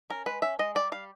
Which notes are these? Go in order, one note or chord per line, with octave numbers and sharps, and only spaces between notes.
C#4 A#4
G#3 B4
C#4 E5
G#3 D#5
G3 D5
G3 F5